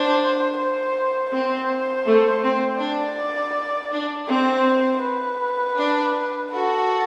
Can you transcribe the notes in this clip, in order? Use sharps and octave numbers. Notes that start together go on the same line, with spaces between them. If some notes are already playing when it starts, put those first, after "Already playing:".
Already playing: D4 C5
C5
C4 C5
A3
C4
D4 D5
D4
C4 C5
B4
D4
F#4 A4